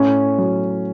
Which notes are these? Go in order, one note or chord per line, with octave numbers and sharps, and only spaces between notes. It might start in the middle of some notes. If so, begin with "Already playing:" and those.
Already playing: A2 C#4
F#3